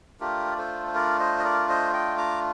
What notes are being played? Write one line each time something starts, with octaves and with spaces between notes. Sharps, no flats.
A3 D4 F4 G4 A#4
D5
A4 C5
C5
A#4 D5
C5 D#5
D#5
A#4 D5
C5 D#5
D#5 G5
A#5 D6